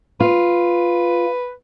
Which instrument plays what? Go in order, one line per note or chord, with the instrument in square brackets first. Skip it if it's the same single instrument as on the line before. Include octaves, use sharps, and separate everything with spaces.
[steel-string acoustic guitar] F4 [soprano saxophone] B4